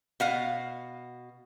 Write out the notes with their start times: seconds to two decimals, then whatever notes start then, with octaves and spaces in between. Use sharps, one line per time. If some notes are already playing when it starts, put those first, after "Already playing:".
0.20 B2 F5 F#5